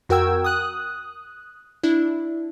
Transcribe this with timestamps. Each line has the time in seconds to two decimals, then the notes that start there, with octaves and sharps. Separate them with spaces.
0.09 F2 F#4 A#4 G5 E6 G#6
0.44 D#6 F#6
1.83 D4 E4